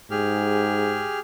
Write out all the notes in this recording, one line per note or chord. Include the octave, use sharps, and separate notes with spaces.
G#2 G4 G#4 F6